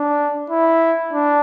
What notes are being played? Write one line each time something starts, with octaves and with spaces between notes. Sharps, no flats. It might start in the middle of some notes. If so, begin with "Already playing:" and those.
Already playing: D4
E4
D4